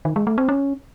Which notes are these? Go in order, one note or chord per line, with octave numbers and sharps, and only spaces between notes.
D#3
G#3
A3
C4
C#4